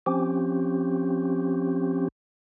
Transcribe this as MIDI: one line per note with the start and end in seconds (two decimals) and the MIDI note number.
0.06 2.08 53
0.06 2.08 60
0.06 2.08 61
0.06 2.08 67